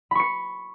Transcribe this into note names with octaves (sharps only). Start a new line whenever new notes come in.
B5 C#6 C#7